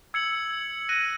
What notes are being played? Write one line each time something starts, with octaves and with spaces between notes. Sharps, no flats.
E6 G#6 C#7 F#7
F#6 A#6 D#7